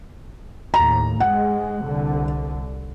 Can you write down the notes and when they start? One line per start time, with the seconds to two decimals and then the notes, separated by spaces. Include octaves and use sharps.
0.74 D#2 A2 A#5
1.20 G#2 G#3 F#5
1.81 C2 D3